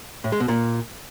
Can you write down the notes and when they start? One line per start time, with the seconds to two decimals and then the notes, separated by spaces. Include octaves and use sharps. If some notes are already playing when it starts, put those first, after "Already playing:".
0.24 A2
0.32 G#3
0.40 B2
0.48 A#2